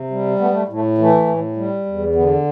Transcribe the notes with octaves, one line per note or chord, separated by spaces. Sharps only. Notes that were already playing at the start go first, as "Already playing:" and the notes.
Already playing: C3
G3
A3 B3
A3
A2
A3
E3 A3
A2
G3
E2
D3 B3